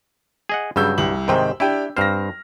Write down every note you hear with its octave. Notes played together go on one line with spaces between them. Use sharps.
G#4 D#5 F#5
G2 C#3 F#3 E6 G6
C2 F#7
G#2 C3 D#3 G4 C5 G5
D4 E4 G4 G5
G2 C4 C5 F6 A#6